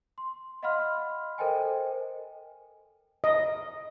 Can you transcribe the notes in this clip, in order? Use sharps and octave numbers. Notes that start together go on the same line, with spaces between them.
C6
D#5 F5 F#5 B5 C6 F6
A4 A#4 C5 D#5 G5 G#5
D#5